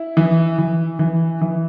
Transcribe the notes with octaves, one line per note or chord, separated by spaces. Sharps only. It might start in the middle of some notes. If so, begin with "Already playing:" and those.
Already playing: E4
E3
E3
E3
E3